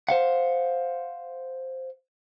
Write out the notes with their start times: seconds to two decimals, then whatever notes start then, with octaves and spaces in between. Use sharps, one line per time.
0.09 C5 F5 F#5